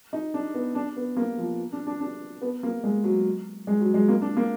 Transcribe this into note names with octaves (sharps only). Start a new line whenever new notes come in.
D#4
D4
B3
D4
B3
A#3
F3
D4
D4
D4
B3
A#3
G#3
F#3
G#3
F#3
G#3
A#3
D4
A#3